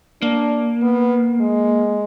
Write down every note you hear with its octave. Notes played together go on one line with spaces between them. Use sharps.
A#3 D4
B3
G#3